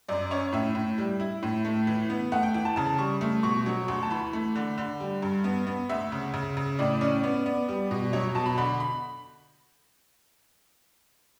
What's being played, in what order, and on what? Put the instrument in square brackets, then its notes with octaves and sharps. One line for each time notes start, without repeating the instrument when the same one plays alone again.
[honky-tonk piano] F#2 D5
C#4 C#5
A2 E5
A2
G3
E4
A2
A3
E3
B3
A3 F#5
G5
E3 G5
A5
C#3 A5
G3 C#6
A3
B2 C#6
F#3
D2
A5
E3 B5
A3
D3
D3
G3
G2
B3
B3
D2 E5
C#3
C#3
C#3
A2 D5
C#4 D5
B3
B3
G3
B2
F#3 C#5
B2 A5
B5
D3 B5
B5